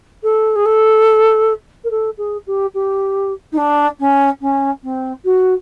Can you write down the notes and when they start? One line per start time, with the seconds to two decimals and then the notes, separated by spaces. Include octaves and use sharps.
0.23 A4
0.55 G#4
0.65 A4
1.84 A#4
1.90 A4
2.18 G#4
2.47 G4
2.74 G4
3.52 D#4
3.57 D4
3.99 C#4
4.41 C#4
4.83 C4
5.25 F#4